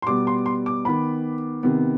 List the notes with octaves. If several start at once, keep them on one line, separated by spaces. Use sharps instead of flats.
C6
B2 G3 B3 D6
C6
C6
D6
D#3 B3 B5
C3 D#3 B3